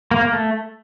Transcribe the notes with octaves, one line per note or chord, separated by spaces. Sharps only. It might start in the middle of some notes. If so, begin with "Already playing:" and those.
A#3
A#3
A3